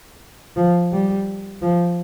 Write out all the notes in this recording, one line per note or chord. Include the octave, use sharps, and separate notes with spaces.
F3
G3
F3